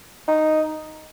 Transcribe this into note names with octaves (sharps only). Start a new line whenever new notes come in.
D#4